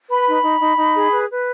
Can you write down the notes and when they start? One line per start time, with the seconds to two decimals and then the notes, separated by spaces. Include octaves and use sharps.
0.10 B4 B5
0.28 D#4
0.44 D#4
0.61 D#4
0.78 D#4
0.95 G#4
1.13 B4
1.30 B4